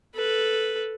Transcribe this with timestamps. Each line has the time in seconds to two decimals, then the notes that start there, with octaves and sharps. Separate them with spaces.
0.15 A4 B4